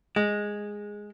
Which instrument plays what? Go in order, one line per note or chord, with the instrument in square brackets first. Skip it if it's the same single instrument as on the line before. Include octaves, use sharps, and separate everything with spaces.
[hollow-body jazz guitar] G#3